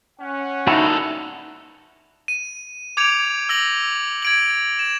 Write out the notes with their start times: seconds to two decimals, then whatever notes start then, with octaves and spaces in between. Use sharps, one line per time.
0.20 C#4 F#5
0.67 A#2 D#4 E4 F#4 A4
2.28 D#7
2.97 D6 G6 G#6 C#7 D7 F7
3.49 E6 A#6 F#7
4.22 G#6 D7 F#7
4.79 E7